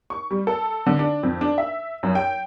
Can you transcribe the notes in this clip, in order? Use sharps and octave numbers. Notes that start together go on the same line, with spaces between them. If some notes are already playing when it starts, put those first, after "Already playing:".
C#6
G3
A4
D3
D4
F2
D4
E5
F#2
G5